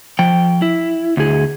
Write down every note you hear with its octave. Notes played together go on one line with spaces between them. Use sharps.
F3 G5
E4
D2 G#4